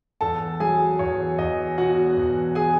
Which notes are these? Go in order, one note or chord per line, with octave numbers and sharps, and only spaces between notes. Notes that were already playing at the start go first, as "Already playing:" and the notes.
E2 A4 A5
F#3 G#4 G#5
E2 C#5
E2 D#5
B2 F#4 F#5
E2
G#4 G#5